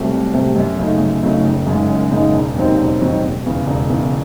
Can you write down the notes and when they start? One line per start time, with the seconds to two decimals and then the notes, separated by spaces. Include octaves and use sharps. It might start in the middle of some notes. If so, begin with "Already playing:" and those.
Already playing: C2 C3 F#3 A3
0.12 C2
0.34 C3 F#3 A3
0.56 F#2
0.78 C#3 F#3 A3 D#4
1.00 F#2
1.22 C#3 F#3 A3 D#4
1.44 F#1
1.67 F#2 C#3 G#3 D#4
1.88 F#1
2.11 F#2 C#3 G#3 D#4
2.33 E1
2.56 D#2 D#3 F#3 C4
2.77 E1
2.99 D#2 D#3 F#3 C4
3.22 E1
3.44 E2 C#3 E3
3.66 E1
3.89 E2 C#3 E3